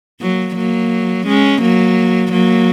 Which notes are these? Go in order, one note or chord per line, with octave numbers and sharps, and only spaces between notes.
F#3 A#3
F#3 A#3
G#3 C#4
F#3 A#3
F#3 A#3